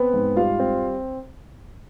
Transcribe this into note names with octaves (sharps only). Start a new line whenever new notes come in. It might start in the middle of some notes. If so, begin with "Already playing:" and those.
Already playing: B3 C4 B4
G#2
G3 F4 F5
C4